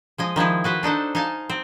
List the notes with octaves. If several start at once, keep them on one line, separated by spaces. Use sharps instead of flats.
F3 G#3 D#5
D#3 F3 G#3 E4
F#4 B4 C5
D4 D#4 A4 C5
D#4 F5 G#5 A5
C4